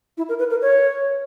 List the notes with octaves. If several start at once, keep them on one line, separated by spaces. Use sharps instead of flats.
E4
A#4
B4
A#4
C#5